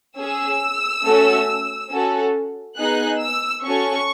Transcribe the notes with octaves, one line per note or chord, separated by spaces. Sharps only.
C#4 G#4 E6
A3 C#4 F#4 A4
C#4 F#4 A4
B3 D#4 G#4 F#6
E6
C#4 F#4 A4 C#6